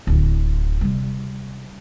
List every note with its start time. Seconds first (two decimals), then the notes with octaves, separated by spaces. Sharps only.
0.07 D1 D2
0.81 C3 G3